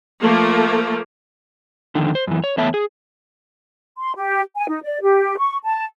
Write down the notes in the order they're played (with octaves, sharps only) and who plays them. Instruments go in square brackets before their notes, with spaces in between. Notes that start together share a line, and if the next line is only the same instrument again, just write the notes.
[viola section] F3 A3 A#3
[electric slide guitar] F2 D3 D#3
C5
F#2 E3
C#5
E2 A3 B3 C#5 E5 A5
G#4
[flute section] C6
G4
G#5
D#4
D5
G4
C#6
A5